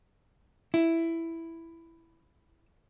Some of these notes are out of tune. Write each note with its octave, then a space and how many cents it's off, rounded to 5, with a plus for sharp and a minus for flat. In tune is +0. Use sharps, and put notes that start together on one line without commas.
E4 +5